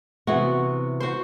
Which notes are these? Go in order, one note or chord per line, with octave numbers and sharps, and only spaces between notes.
C3 E3 B3 F#4
F#4 C5